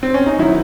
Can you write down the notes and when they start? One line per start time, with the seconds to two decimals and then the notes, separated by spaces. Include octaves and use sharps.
0.03 C4
0.14 C#4
0.26 D#4
0.39 D#3 F#3 E4